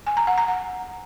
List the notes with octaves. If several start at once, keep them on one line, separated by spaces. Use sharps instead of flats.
G#5
A#5
F#5
A#5
F#5